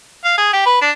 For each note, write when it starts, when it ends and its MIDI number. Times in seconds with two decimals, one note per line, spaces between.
0.24 0.33 77
0.38 0.50 68
0.53 0.61 67
0.66 0.77 71
0.81 0.91 62